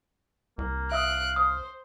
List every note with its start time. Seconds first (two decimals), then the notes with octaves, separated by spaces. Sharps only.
0.58 C2 A#3
0.92 E5 F5 D#6 E6 F#6 D7
1.36 C5 D#6